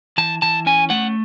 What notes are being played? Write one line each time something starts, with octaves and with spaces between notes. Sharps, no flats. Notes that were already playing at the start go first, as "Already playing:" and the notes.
E3 A5
E3 A5
C#4 G#5
A3 F#5